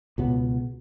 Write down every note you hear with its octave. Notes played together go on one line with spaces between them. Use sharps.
C#2 B2 B3